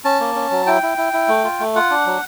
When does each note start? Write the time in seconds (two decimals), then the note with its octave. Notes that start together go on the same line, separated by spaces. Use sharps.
0.05 C#4 A5
0.20 A#3
0.35 C#4
0.51 F#3
0.67 E4 G5
0.83 E4
0.98 E4
1.13 E4
1.29 A3
1.44 F4
1.60 A3
1.75 F4 F#5
1.90 D4
2.06 F#3